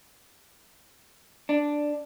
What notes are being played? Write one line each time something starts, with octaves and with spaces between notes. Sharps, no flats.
D4